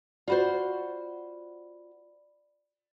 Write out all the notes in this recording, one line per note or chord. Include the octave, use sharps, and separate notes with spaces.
F4 F#4 C5 D5 B5